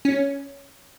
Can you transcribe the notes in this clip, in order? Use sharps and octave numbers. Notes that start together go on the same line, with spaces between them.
C#4